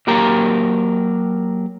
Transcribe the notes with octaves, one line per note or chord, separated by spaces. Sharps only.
F#3 A#3 G4 A#4 A#5